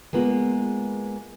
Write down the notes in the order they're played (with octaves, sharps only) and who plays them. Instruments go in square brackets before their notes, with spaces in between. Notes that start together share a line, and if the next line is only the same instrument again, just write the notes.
[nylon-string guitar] G#3 A#3 B3 F4